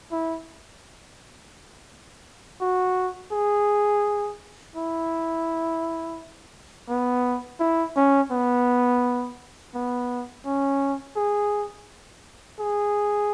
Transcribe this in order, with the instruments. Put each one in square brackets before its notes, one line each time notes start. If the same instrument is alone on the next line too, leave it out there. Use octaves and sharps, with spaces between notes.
[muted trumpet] E4
F#4
G#4
E4
B3
E4
C#4
B3
B3
C#4
G#4
G#4